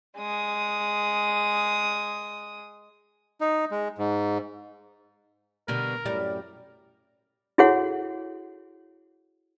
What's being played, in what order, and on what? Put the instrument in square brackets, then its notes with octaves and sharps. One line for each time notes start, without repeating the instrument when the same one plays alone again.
[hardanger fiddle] G#3 D#6
[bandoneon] D#4
G#3
G#2
[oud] B2 D3 G3 [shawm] A#4
[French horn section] F#2 A2 D5 [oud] G3
[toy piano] E4 F#4 G#4 A4 C#5 F#5